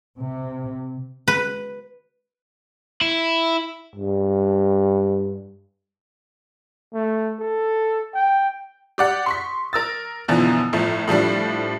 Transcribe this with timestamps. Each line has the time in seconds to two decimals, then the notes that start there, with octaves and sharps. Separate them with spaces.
0.18 C3
1.28 B4
3.01 E4
3.96 G2
6.94 A3
7.40 A4
8.14 G5
8.98 G4 D5 F#5
9.26 C6 C#6 B6
9.73 A#4 E6 A6
10.28 F#2 B2 D3 E3 F3
10.73 G1 A2 F3
11.08 A2 F3 G3 D4